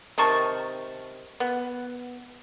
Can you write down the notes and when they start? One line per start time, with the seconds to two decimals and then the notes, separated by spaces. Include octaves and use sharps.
0.18 C3 D#3 A5 C#6
1.40 B3